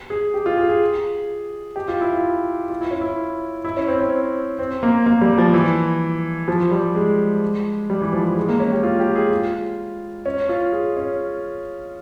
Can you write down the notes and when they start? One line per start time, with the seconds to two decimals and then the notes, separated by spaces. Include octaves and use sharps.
0.10 G#4
0.34 G4
0.46 F4
0.57 G#4
0.69 G#4
1.76 G4
1.88 F4
2.01 E4
2.13 F4
2.70 F4
2.81 E4
2.91 C#4
3.01 E4
3.65 E4
3.77 C#4
3.88 C4
4.00 C#4
4.59 C4
4.83 A#3
5.06 A#3
5.21 G3
5.38 F3
5.54 E3
6.48 F3
6.71 G3
6.95 G#3
7.90 G3
8.02 E3
8.13 F3
8.37 G#3
8.49 A#3
8.60 C#4
8.72 G4
8.83 F4
9.00 G4
9.16 G#4
9.31 F4
10.26 C#4
10.49 F4
10.73 G#4
10.97 C#4